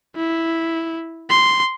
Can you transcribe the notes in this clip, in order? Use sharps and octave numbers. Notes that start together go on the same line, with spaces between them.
E4
C6